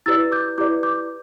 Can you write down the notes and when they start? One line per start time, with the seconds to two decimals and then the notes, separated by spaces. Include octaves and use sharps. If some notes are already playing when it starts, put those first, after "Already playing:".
0.06 E4 G4 B4 D5 E6 A6
0.32 D6 G6
0.58 E4 G4 B4 D5 D6 G6
0.83 D6 G6